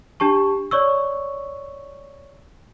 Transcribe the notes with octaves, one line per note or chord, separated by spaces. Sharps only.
D4 G4 A5 C#6
C#5 D5 C#6 E6